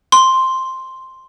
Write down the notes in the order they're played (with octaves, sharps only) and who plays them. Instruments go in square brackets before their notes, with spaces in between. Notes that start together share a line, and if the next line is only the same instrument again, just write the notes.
[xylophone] C6